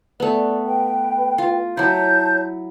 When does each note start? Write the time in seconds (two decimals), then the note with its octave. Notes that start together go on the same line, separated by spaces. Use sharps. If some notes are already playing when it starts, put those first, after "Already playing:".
0.20 A3 B3 D5
0.66 B4 G5
1.38 F4
1.77 F#3 E4 C#5 A5 G6